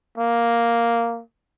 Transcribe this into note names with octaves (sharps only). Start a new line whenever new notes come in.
A#3